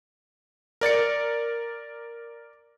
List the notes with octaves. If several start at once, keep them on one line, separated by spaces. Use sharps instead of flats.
A#4 D5 A6 C#7